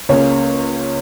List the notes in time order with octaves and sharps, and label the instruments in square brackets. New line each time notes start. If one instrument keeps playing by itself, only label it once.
[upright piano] C#2 C#3 A#3 C#4 C#5